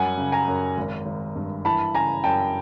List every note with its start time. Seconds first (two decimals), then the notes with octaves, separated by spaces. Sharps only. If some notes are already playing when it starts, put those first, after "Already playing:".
Already playing: F#2 G3 F#5 G#5
0.18 C#3
0.32 G#5 A#5
0.48 F#2
0.77 G#1
1.06 G#1
1.36 G2
1.65 E3 A5 B5
1.94 C#3 G#5 A#5
2.24 F#2 G5 A5